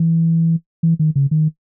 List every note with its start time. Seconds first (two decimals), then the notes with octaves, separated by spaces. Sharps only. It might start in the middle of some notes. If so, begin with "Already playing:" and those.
Already playing: E3
0.83 E3
0.99 D#3
1.16 C#3
1.31 D#3